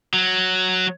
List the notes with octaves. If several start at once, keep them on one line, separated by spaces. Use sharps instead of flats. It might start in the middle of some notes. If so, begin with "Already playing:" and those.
F#3